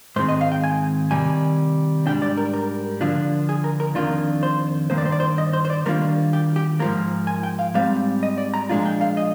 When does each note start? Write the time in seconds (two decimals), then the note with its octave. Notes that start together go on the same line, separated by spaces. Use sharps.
0.16 G#2 D#3 G#3 C4 C5
0.29 D#5
0.41 F5
0.52 G5
0.64 G#5
1.11 C3 D#3 G3 G#5
2.06 G#2 G3 D4 G5
2.22 D5
2.37 A#4
2.54 A#4
3.01 D3 F3 A#3 D4 F4
3.49 G#4
3.64 A#4
3.80 A#4
3.95 F2 D#3 A#3 D4 F4
4.43 C5
4.90 G2 D#3 A#3 C5
4.98 D5
5.05 C5
5.12 D5
5.20 C5
5.38 D#5
5.53 C5
5.65 C5
5.70 D5
5.85 D#3 G3 A#3 D4 F4 A#4
6.33 G4
6.56 G4
6.79 G#2 F3 A#3 A#4
7.27 G#5
7.43 G5
7.59 F5
7.74 G#2 G3 C4 F5
8.23 D#5
8.38 D5
8.54 A#5
8.69 A#2 F3 G#3 D4 F4
8.85 G5
9.01 F5
9.17 D#5